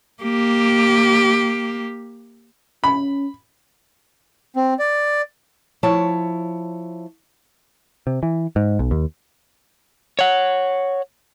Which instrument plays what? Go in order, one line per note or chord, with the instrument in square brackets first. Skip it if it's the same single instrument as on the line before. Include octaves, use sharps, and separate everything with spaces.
[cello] A#3 G4
[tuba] C#4 [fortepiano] B5
[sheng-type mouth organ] C4
D5
[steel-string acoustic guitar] F3 E4 C#5 A5
[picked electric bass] C3
E3
G#2
B1
D#2
[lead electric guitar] C#5 F#5